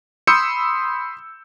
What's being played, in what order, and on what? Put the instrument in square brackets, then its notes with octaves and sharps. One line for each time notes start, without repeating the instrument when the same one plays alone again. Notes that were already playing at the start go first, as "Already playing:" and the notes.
[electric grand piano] B5 C6 D#6 E6 G6 C#7